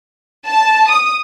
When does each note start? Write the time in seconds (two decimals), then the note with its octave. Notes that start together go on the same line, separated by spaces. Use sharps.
0.46 A5
0.89 D#6